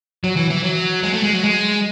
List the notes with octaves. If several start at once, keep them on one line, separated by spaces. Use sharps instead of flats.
F#3
E3
E3
F#3
G#3
A3
G#3
F#3
G#3